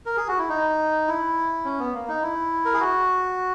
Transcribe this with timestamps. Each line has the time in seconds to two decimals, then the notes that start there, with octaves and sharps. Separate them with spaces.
0.06 A#4
0.17 G#4
0.28 F#4
0.38 E4
0.49 D#4
1.08 E4
1.65 C#4
1.79 B3
1.94 A#3
2.08 D#4
2.23 E4
2.65 A#4
2.74 G#4
2.80 F#4